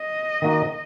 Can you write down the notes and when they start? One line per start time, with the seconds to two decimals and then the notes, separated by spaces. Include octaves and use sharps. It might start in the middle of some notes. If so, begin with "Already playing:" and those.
Already playing: D#5
0.42 D#3 A#3 D#4 F#4